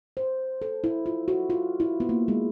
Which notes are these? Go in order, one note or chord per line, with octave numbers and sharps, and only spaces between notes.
C5
A4
E4
F4
F#4
F4
E4
B3
A#3
G#3